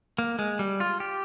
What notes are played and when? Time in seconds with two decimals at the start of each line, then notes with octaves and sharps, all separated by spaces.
0.18 A#3
0.39 G#3
0.59 G3
0.80 F4
1.00 G4